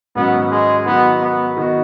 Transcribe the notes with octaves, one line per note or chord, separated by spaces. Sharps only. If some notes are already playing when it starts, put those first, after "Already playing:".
G#2 D#3 F#3 B3 C#4 F#4
G#3
D#3 F#3 B3 D#4 F#4
B3
D#3 B3 D#4 F#4